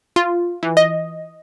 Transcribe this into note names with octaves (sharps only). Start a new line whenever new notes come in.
F4
E3
D#5